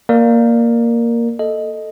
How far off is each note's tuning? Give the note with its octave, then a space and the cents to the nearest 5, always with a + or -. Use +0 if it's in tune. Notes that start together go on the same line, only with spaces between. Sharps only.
A#3 +0 A#4 +0 D5 +15
A4 +0 D#5 +0